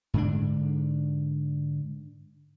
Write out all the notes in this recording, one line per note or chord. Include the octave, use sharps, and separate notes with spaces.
G#2 D3 D4